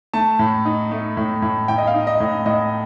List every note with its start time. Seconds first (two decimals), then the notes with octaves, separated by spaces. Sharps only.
0.14 A3 A5
0.39 A2
0.65 D#4
0.92 A3
1.17 A2
1.42 A2
1.68 A2 G5
1.78 D#5
1.87 F5
1.94 D#4
2.07 D#5
2.20 A2
2.46 A2 D#5